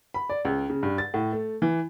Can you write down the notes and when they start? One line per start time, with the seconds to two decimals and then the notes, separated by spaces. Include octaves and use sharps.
0.14 B5
0.30 D5
0.45 C#2
0.70 C#3
0.83 G2
0.98 A6
1.14 A2
1.32 A3
1.62 E3